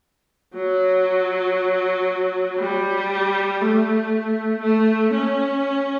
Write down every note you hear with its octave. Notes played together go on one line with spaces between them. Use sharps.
F#3
G3
A3
A3
C#4